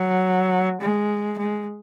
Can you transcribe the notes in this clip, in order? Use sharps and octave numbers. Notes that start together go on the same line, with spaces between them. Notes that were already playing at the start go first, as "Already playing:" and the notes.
Already playing: F#3
G#3
G#3